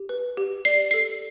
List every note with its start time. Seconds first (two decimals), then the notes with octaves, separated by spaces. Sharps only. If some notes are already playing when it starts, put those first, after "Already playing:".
Already playing: G4
0.09 B4
0.37 G4
0.65 D5 C7
0.91 A4 C7